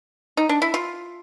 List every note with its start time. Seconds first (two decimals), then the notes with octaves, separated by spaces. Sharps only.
0.37 D#4
0.49 D4
0.62 E4
0.74 F4